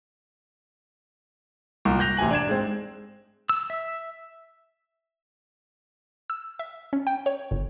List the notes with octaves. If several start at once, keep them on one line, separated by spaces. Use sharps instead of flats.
C2 A#2
F#6 G6 A#6 F7
A1 C3 G4 G#5 F#7
D4 G#6 E7
G#2 G#3 C4
E6
E5
E6
E5
C#4
G5
C#5
G1